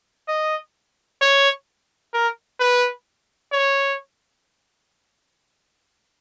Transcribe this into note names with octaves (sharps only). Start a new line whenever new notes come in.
D#5
C#5
A#4
B4
C#5